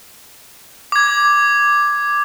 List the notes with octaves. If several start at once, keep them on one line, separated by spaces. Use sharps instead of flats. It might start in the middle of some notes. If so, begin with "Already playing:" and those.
D6 G#6